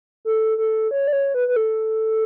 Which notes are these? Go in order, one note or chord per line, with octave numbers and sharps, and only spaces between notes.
A4
A4
C#5
D5
C#5
B4
B4
A4